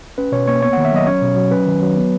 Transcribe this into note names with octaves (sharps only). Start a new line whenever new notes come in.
C#4 B4
B2 C#5
A#3 C#5
B3 C#5
D#3 F#5
E5
F#3 D#5
C#4 C#5
B2
F#3
C#4 B4
D#3
F#3
B3